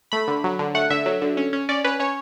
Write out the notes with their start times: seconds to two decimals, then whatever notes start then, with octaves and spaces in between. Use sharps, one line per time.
0.12 A3 B5
0.28 D3
0.44 F#3
0.59 D3
0.75 A3 F#5
0.90 D3 E5
1.06 F#3
1.22 D3
1.37 C#4
1.53 C#4
1.69 C#4 D5
1.84 C#4 B4
2.00 C#4 C#5